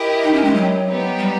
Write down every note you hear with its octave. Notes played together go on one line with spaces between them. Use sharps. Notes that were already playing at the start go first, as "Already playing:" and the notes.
Already playing: E4 G4 A#4 D#5
D#4
C#4
G#3
F#3
B3 D#4 G4
G3